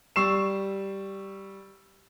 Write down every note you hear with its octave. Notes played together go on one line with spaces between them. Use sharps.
G3 C#6 E6 C7 E7